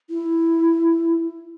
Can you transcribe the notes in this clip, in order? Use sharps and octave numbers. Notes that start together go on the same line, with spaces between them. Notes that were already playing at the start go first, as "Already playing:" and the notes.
E4